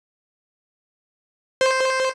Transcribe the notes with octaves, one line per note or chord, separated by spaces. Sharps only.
C5